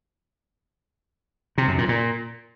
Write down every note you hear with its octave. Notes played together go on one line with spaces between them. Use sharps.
C3
F#2
A#2
A#2